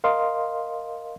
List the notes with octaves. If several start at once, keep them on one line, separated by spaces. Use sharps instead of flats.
A#4 D#5 F5 C6